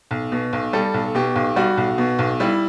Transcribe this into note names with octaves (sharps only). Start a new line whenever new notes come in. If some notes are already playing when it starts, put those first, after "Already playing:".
B1
B2
B1
G3 A4
B1
B2 G4
B1
G3 F#4
B1
B2
B1
G3 E4